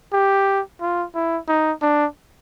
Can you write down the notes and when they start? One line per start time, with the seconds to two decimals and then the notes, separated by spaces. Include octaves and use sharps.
0.13 G4
0.81 F4
1.15 E4
1.48 D#4
1.82 D4